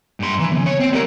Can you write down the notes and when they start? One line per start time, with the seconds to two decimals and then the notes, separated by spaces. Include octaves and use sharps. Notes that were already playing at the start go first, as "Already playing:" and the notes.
0.20 G2 C6
0.40 E3
0.52 E2 C#3
0.66 C#5
0.80 C4
0.93 G3 A#4